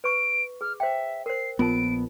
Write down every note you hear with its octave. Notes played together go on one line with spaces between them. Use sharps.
B4 C#6 D7
G#4 F6
C5 E5 G5
A#4 C5 C7
A#1 B3 F4 A#4 A5 D7